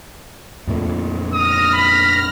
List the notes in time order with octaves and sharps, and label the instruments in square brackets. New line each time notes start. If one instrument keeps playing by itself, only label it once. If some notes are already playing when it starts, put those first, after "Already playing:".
[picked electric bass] F2 A#2 A3
[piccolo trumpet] D#6 [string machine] F6 A#6
[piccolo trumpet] B5